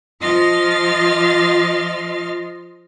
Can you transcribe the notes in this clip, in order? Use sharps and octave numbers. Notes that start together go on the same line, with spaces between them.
F3 F4 D#5 C6 F6 A6